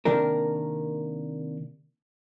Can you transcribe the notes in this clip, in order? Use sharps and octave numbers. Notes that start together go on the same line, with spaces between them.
C3 D#3 A#3 D4 A#4